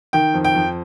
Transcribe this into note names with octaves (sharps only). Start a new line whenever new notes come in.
D#3 G5
F2
G5
F2